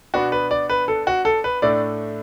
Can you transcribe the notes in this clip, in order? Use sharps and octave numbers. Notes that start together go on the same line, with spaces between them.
B2 B3 D4 F#4
B4
D5
B4
A4
F#4
A4
B4
A2 A3 D4 D5